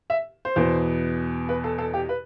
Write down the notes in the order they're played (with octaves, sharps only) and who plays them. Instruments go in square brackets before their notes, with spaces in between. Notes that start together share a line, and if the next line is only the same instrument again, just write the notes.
[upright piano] E5
C5
E2 B2 B3
B4
A4
A4
G4
B4